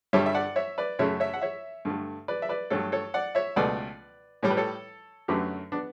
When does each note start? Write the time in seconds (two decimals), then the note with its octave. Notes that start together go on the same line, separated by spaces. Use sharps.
0.13 G2 D3 G3 C#5 E5
0.26 E5
0.34 D5 F#5
0.56 C#5 E5
0.78 B4 D5
0.99 F#2 C#3 F#3 A3 C#5 E5
1.20 C#5 E5
1.34 F#5
1.41 C#5 E5
1.85 G2 D3 A3
2.28 B4 D5
2.42 E5
2.49 B4 D5
2.70 G2 F#3 A3 A4 C#5
2.92 A4 C#5
3.14 D5 F#5
3.35 C#5 E5
3.56 C#2 B2 A3 B4 D5
4.43 A2 G3 C#5
4.50 B4
4.57 A4 C#5
5.28 F#2 D3 F#3 A3 G4 B4
5.72 B3 D4